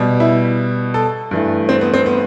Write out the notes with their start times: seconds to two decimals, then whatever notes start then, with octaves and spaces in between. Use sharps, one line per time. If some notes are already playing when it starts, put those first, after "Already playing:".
Already playing: B2 G3
0.20 E4
0.94 A4
1.31 G2 E3 A3
1.69 C4
1.81 B3
1.94 C4
2.06 B3